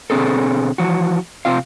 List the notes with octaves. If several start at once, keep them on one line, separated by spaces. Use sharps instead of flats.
B2 D3 C4 G#4 A4
E3 F3 F#4
C3 C4 F4 F5